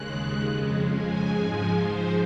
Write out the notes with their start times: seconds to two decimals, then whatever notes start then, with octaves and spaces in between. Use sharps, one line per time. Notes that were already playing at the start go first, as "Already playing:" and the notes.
Already playing: D#2 C#3 G#3 F#6
0.47 F2 C#3 G#3
0.90 G#5
1.31 G#2 F3 G#3
1.73 C5